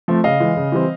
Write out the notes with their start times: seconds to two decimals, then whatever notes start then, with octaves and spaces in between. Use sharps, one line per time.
0.08 F3 A3 C4
0.24 C#3 D#5 F5
0.40 E3 G#3
0.56 C#3
0.72 E3 G3 C4